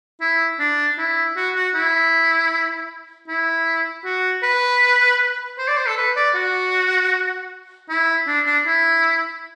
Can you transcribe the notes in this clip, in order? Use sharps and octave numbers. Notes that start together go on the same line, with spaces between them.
E4
D4
E4
F#4
F#4
E4
E4
F#4
B4
C5
D5
C5
A4
B4
D5
F#4
E4
D4
D4
E4